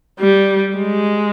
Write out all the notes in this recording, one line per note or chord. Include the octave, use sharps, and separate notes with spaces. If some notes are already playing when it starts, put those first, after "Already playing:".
G3
G#3